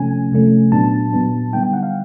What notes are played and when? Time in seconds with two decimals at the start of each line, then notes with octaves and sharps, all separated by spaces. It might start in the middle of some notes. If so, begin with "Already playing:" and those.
Already playing: C3 F3 A3 C#4 G#5
0.32 C3 F3 A3 C#4
0.72 A#2 F#3 B3 D4 A5
1.12 A#2 F#3 B3 D4
1.53 D3 G3 B3 D#4 G5
1.63 G5
1.73 F#5
1.83 F5